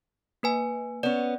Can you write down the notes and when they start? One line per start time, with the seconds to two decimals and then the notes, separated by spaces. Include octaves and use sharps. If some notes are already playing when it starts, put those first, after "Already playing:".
0.43 A#3 B4 G#5
1.03 B3 C#4 D5